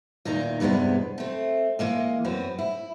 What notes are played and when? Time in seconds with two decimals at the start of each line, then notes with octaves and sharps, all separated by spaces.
0.25 E2 A#2 D#3 D#4 A#5
0.60 E2 G2 C3 G#3 B3
1.18 A3 C4
1.79 E3 G#3 A#3 D#5
2.25 F#2 B3 C4 F#4
2.58 E4